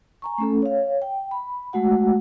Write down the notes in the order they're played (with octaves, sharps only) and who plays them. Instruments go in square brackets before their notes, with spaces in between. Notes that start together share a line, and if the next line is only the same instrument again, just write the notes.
[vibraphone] G#5 A#5 C#6
A3 C#4 A4
C#5 F5
G5
B5
G#3 A3 F#4 F#5